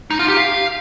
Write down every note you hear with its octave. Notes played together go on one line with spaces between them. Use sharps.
D#4
F4
G4
F5